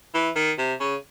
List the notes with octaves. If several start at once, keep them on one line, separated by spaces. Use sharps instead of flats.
E3
D#3
C3
C#3